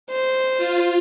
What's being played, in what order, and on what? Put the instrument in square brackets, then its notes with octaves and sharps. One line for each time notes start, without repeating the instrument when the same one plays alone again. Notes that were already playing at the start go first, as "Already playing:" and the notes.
[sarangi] C5
[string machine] F4